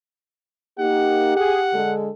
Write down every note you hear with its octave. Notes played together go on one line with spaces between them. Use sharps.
A#3 D#4 G4 F#5
G#4 F#5
D3 G#3 A4